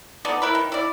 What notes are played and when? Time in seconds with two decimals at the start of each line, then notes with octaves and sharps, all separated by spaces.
0.25 B3 D#4 A4 D5
0.42 E4 A#4 B4
0.55 D#3
0.72 E4 D5